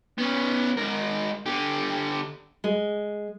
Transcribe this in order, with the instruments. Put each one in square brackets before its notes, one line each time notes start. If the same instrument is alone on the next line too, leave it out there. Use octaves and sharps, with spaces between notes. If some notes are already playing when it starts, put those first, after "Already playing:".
[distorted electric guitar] B3 C#4
G#2 A#4
D3 G4
[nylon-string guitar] G#3